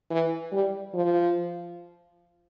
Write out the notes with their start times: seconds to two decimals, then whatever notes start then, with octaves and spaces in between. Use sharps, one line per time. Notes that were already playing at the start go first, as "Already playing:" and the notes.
0.10 E3
0.52 G3
0.94 F3